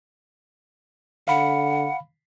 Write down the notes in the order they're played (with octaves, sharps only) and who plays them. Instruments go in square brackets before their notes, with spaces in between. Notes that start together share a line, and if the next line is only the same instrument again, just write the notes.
[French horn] D3 [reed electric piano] F5 B5 [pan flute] F#5